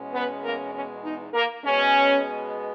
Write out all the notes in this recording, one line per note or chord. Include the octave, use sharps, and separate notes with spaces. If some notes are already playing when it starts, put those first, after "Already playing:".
Already playing: E2 B2 G#3 C#4
B3 B4
A#3 A#4
C#4
D#4
A#3 A#4
B2 G#3 B3 C#4